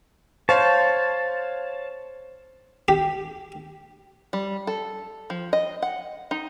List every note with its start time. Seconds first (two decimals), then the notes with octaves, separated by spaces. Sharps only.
0.49 C5 C#5 F5 A5 C#6
2.88 G4
4.33 G3
4.67 A4
5.30 F3
5.53 D#5
5.82 F#5
6.31 D#4